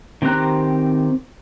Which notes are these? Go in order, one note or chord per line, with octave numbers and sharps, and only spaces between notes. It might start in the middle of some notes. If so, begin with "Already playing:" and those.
D#3 C4 G4 A#5 F#6